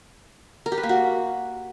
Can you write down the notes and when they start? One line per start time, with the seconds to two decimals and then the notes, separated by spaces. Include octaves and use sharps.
0.66 A#4
0.72 G4
0.78 B4
0.83 A#3
0.89 F#4